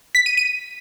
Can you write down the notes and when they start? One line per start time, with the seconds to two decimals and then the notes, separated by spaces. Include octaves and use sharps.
0.15 B6
0.26 D#7
0.37 D#7